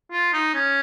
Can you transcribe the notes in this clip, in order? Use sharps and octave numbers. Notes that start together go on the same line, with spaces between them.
F4
D#4
C#4